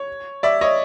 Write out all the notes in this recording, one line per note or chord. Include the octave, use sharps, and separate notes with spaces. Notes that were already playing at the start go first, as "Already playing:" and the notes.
Already playing: C#5
D5 E5
C#5 D#5